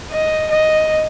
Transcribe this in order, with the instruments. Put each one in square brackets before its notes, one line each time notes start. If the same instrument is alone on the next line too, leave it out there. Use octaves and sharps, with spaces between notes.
[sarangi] D#5
D#5